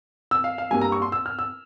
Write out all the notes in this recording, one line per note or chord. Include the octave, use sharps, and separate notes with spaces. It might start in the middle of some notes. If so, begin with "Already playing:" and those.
E6
F5
F5
G2 G3 A#3 G#5
A#5
C#6
C6
E6
F6
E6